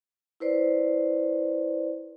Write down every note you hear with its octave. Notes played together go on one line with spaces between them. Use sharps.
E4 B4 C5 D5